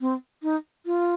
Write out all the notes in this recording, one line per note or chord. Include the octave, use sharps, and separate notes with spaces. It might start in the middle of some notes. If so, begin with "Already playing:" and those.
C4
D#4
F4